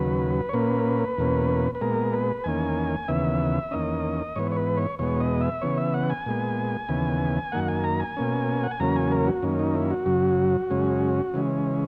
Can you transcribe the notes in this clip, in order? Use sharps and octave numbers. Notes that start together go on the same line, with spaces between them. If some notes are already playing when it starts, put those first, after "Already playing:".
Already playing: D#2 C#3 F#3 B4
C#5
A#2 A#3 C#4 B4
E2 B2 A#3 C#4
B4
A#2 G#3 B3 A#4
B4
E2 D#3 A#3 C#4 G#5
D#2 C#3 E3 B3 E5
E2 D#3 A#3 C#4 D#5
G#2 E3 B3 C#5
C#5
B4
C#5
E2 B2 G#3 B3 C#5
D#5
E5
C#3 E3 B3 C#5
E5
F#5
G#5
A#2 G#3 B3
D#2 C#3 E3 B3
F#2 D#3 A#3 F#5
G#5
A#5
G#5
B2 A#3 C#4
F#5
G#5
E2 C#3 F#3 A#3 C#4 A#5
G#5
A#4
F#4
F#2 D#3 A#3 C#4
D#4
E4
F#4
F#2 C#3 F#3
F#2 C#3 G#3 C#4
C#3 E3 G#3 C#4